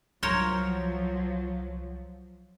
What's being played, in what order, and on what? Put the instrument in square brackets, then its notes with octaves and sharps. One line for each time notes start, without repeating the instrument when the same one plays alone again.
[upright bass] C2 [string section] F3 F#3 [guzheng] A#4 C5 C#5